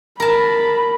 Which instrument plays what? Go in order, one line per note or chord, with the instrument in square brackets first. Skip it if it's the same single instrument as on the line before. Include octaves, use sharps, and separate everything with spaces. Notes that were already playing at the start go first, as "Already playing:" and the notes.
[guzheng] A#4 A5 [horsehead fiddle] B5